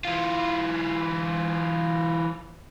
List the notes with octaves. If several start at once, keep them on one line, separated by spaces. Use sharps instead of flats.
E3 F4